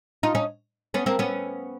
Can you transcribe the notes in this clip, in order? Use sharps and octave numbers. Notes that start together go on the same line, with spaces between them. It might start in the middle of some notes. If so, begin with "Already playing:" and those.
D#4 F4
C#4 D#4
B3 C#4
A#3 C4
B3 C#4